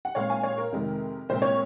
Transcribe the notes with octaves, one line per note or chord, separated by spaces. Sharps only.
F#5
A#2 G#3 C4 C#5 F5
F5 G#5
C#5 F5
A#4
F2 C3 D#3 G#3
C2 A#2 G#3 C4 C5
C#5